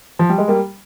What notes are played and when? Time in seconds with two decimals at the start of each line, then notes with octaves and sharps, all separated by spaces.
0.19 F3
0.30 G3
0.38 G#3
0.48 G3 A#3